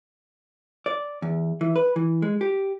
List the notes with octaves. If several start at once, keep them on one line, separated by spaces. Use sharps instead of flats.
D5
E2
E3
B4
E3
G#3
G4